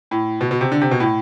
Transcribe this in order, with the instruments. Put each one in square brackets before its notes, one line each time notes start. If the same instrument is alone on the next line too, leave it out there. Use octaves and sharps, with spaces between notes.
[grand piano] A2
B2
B2
C3
D3
C3
B2
A2